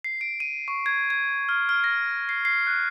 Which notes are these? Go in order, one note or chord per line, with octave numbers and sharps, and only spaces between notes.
C7
D7
D#7
C#6
G#6
G#6
F6
F6
A#6
C7
C7
F#6